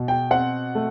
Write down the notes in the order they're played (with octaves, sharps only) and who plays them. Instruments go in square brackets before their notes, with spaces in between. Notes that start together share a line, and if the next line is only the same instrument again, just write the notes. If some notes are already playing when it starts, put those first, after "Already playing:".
Already playing: [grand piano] B2
G5
C4 F#5
A3